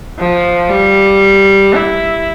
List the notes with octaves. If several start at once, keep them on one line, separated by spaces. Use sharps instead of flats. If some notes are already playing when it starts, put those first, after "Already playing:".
F3
G3
E4